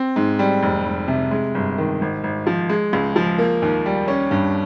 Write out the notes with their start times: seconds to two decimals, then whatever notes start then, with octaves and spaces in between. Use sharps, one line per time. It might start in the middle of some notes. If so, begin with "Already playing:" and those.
Already playing: C4
0.16 G#2
0.39 G3
0.63 F1
0.86 F1
1.08 C3
1.31 G#3
1.55 G1
1.78 D#3
2.01 G#1
2.23 G#1
2.47 F3
2.69 G#3
2.93 C#2
3.16 F3
3.38 A#3
3.62 D#2
3.86 G3
4.08 C#4
4.31 G2